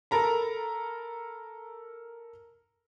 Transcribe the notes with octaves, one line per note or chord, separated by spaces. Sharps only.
A4 A#4 A#5 B5